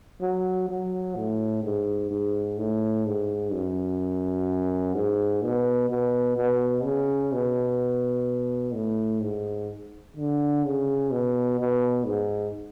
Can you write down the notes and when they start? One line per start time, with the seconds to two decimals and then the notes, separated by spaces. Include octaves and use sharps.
0.21 F#3
0.68 F#3
1.16 A2
1.63 G#2
2.11 G#2
2.58 A2
3.06 G#2
3.53 F#2
4.95 G#2
5.42 B2
5.89 B2
6.37 B2
6.84 C#3
7.33 B2
8.74 A2
9.22 G#2
10.17 D3
10.64 C#3
11.11 B2
11.59 B2
12.06 G#2